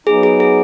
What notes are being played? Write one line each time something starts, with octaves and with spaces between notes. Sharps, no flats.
F#3 B3 D#4 G#4
G#4
G#4